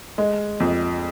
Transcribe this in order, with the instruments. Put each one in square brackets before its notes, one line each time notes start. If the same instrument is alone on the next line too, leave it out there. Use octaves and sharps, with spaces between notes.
[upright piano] G#3
F2